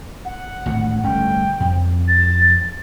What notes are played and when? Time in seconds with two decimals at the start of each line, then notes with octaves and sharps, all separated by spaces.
0.25 F#5
0.66 G#1 D2 A2
1.04 G1 A3 C#4 G5
1.60 F2
2.08 A6